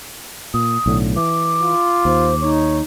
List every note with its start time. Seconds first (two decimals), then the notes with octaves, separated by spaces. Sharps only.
0.54 A#2 D#6
0.86 B1 A2 D3
1.16 E3 D6
1.61 F4
2.05 D#2 C5
2.42 D#4 C#5